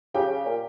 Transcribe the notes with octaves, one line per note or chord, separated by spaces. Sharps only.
C#3 G4 G5
C#3
A#2